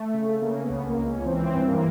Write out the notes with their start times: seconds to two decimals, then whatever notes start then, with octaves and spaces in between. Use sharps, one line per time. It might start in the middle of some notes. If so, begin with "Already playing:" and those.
Already playing: A3
0.14 C#3
0.42 C#3 A#3
0.63 B3
0.69 C#2
0.84 A#3
0.98 C#2
1.04 C#4
1.25 E3 C4
1.54 G2
1.68 A#3